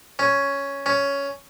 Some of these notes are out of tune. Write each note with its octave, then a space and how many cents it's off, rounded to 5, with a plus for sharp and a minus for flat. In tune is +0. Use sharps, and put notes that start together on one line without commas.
C#4 +5
C#4 +10